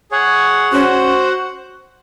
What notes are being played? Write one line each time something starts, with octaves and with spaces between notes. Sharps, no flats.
G#4 C#5 F#5
C#4 F#4 C5 F#5